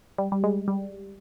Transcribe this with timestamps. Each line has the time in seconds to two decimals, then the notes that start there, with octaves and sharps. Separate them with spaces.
0.18 G3
0.32 G3
0.44 G#3
0.68 G3